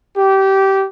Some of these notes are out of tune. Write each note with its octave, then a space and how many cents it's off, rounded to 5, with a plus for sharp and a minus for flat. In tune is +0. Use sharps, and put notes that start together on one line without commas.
G4 -20